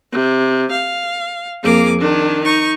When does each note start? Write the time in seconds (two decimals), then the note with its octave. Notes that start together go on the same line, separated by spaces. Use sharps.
0.12 C3
0.71 F5
1.63 F2 A#3 G#4 D6
2.00 D#3 D4
2.44 D#4 C#6